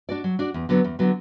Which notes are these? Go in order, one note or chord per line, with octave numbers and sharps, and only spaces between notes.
D4 F#4 D5
F#3
D4 F#4 D5
E2
D3 F#3 B3
E2
D3 F#3 B3